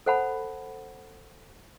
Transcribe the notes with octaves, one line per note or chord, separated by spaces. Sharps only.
A4 C5 F#5 A5 B5